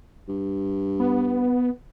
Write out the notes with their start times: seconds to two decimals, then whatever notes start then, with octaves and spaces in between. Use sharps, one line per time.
0.29 G2
1.00 B3